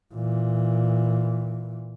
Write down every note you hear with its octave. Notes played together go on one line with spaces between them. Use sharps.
A#2 E3